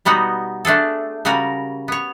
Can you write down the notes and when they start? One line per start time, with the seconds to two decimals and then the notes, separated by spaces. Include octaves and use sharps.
0.05 B2 G3 B3 D#4 F#4
0.65 A3 D4 G#4 A4
1.25 C#3 G3 F#4 A#4 G#5
1.88 B3 C#5